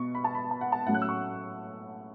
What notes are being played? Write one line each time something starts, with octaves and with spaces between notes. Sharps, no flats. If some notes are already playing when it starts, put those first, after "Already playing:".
Already playing: B2 B3 C#6
B5
A5
B5
A5
F#5
A5
A2 F#3 A3 C#4 F#5
F#6
E6
C#6